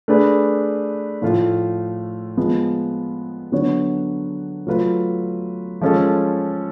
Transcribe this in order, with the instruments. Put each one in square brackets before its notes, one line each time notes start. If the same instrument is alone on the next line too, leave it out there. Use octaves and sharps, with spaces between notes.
[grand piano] A3 D4 G#4 B4
A2 F3 A3 F4
F3 G#3 B3 F4
D3 F#3 B3 F#4 C#5
F#3 A3 F4 B4
F3 G#3 C#4 F4 A4